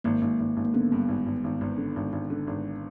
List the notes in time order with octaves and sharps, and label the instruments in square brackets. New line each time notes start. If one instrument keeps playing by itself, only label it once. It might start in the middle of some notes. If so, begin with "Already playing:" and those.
[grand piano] G#1 [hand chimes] A#3
[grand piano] G#1
G#1
G#1
[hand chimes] A#3
[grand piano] D3 [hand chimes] B3
[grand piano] G2
G#1
G#1
G#1
G#1
D3
G#1
G#1
D3
G#1